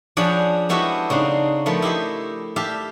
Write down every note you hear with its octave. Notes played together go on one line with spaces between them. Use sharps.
F3 C#4 D4 G#4 F#5 B5
G#3 B3 E4 F#4 G4 A4
C#3 C4 D4 D#4
F3 A3 B3 A#4
E4 G4 C5 D#5
G4 E5 F5 A5